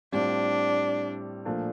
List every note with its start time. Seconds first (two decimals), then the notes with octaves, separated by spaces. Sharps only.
0.12 A2 G3 C4 D4 F4
1.45 A#2 F3 A3 D4 F4